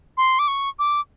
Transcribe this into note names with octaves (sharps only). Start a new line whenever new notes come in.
C6
D6
C#6
D6